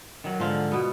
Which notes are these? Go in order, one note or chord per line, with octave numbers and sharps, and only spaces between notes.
D#3 F#3
G#2 D3 F3 F4
B2 B3